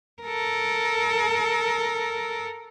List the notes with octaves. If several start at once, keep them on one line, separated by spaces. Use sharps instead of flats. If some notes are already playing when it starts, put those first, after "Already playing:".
A4 A#4